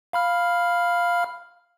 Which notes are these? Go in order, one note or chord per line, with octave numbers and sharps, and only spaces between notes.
F5 B5 F6